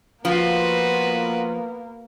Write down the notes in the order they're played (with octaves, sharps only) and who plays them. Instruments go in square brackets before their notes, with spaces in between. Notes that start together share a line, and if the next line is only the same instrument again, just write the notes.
[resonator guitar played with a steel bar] F3 F4 [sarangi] A#3 [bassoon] B3 [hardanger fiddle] F#4 B4